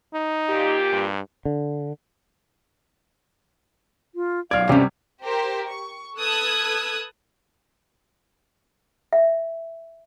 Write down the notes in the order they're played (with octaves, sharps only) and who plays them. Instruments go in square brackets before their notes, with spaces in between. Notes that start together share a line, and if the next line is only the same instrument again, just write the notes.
[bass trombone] D#4
[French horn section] A#2 G4
[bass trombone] G2
[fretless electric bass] D3
[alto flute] F4
[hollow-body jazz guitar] B1 D5 [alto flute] F5 [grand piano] F6 G#6
[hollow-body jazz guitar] G2 C#4 [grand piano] C3 G3
[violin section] G4 A#4 C5
C#6
A4 B4 D#6 E6 F#6 G#6
[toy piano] E5